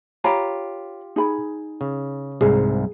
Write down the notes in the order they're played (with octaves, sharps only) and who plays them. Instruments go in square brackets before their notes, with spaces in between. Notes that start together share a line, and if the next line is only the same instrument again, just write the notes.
[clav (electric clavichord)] F4 G4 [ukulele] C#5 A#5 B5
[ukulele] D#4 G#4 B5
[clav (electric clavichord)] C#3
[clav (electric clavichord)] C2 G#2 [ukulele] G#4